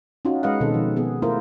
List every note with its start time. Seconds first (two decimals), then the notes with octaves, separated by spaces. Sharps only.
0.25 C#4 D#4 F4 F#4
0.43 G#3 B4 D#5 F5 F#5
0.60 B2 D#3 C4 A4
0.74 F3
0.96 B3 G#4
1.22 A3 E4 F4 A#4 C5